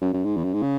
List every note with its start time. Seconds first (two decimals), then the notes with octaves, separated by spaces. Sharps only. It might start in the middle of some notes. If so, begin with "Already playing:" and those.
0.02 F#2
0.13 F#2
0.25 G#2
0.37 E2
0.44 F#2
0.54 G#2
0.62 C#3